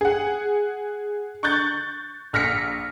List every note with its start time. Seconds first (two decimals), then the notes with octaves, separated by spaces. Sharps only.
0.01 G#4 F#5
1.43 C#6 F#6 G6 A6
2.33 A#1 F6 A#6 B6 C#7